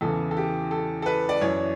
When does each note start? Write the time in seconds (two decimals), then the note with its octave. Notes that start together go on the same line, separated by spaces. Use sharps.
0.01 E2 C#3 E3 A4
0.31 A4
0.37 G4
0.71 A4
1.02 A4
1.06 B4
1.29 D5
1.41 F#2 E3 C#5